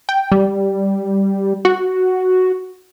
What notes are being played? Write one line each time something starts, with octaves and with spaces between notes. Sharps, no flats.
G5
G3
F#4